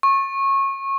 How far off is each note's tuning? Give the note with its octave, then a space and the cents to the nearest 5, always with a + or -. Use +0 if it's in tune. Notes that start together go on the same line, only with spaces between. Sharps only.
C#6 -25